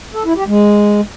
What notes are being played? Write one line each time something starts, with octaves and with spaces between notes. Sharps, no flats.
A4
E4
G4
G#3